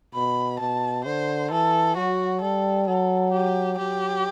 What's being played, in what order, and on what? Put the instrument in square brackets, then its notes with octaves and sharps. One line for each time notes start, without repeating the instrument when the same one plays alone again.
[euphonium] B2 [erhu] B5
[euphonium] B2 [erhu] A5
[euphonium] D3 [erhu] C5
[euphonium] E3 [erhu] A4
[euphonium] F#3 [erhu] F#4
[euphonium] G3 [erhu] A4
[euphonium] F#3 [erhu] A4
[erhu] G4
[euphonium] F#3 [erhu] G4